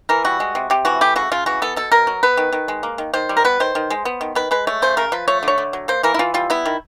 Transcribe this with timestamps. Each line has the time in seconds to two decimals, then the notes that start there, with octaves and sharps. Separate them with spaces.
0.09 E3 A#4
0.25 G3 F#4
0.40 G#3
0.55 C3
0.70 C3 G4
0.85 E3 F#4
1.01 A3 G4
1.16 C#3 F#4
1.32 C#3 F4
1.46 E3 F#4
1.62 B3 A4
1.76 B2 A4
1.92 B2 A#4
2.07 F#3
2.23 B3 B4
2.37 D#3
2.53 D#3
2.68 G#3
2.83 A#3
2.98 D#3
3.13 D#3 C5
3.29 G3
3.37 A#4
3.44 B3 B4
3.60 D#3 C5
3.75 D#3
3.90 G#3
4.05 B3
4.21 D#3
4.35 D#3 B4
4.51 G#3 B4
4.67 A3 C#5
4.82 C#3 C5
4.97 C#3 A#4
5.12 F3 B4
5.28 A3 C#5
5.43 D3 C#5
5.58 D3
5.73 F#3
5.88 A#3 C5
6.03 E3 A#4
6.14 E4
6.19 E3 F4
6.34 G3 F4
6.50 B3 E4
6.66 D#3